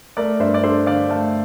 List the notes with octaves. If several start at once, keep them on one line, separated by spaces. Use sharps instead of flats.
A3 A#4 D5
G2 C5 E5
D5
D4 A4 C5
D3 D5 F5
A3 F5 A5